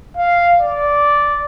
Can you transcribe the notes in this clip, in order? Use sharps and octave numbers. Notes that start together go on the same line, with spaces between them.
F5
D5